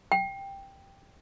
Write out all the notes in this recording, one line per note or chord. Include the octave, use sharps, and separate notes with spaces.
G5